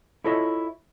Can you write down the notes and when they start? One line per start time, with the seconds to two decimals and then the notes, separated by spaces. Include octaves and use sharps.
0.24 E4 F4 A4 C#5 D#5 E5